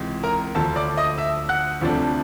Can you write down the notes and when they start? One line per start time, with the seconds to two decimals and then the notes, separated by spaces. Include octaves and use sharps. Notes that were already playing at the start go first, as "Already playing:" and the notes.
Already playing: C#2 C3 E3 G#3
0.23 A#4 A#5
0.55 D2 D3 F3 A4 A5
0.76 D5 D6
0.97 D#5 D#6
1.18 E5 E6
1.49 F#5 F#6
1.81 D2 C3 F3 A3 D4